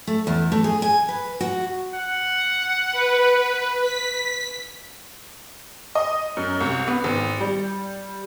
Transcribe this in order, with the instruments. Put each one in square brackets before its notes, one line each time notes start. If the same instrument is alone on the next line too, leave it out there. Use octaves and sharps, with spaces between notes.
[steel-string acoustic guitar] A3
E2
A3
G#4
G#5
B4
F#4
[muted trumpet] F#5
[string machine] B4
B6
[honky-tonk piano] D#5
F#2
C2
B3
G#1
G3